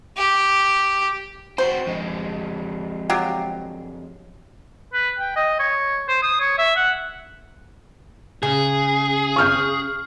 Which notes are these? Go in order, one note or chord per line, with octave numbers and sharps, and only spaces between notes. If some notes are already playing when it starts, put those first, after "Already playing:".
G4
C4 F#4 C5
F2 G#3
F#3 F4 G4
B4
G5
D#5
C#5
C5
D#6
C#5
E5
F#5
C#3 G#4
C#6 F6 G6